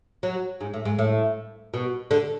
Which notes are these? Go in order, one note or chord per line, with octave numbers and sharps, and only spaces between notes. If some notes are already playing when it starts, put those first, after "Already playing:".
F#3
G#2
A2
G#2
A2
B2
D3